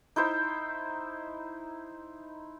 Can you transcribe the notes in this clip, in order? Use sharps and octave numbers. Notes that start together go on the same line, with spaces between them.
D#4 E4 C5